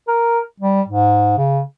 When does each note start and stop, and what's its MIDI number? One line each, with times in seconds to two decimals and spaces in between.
0.08 0.40 70
0.60 0.82 55
0.89 1.36 44
1.38 1.61 49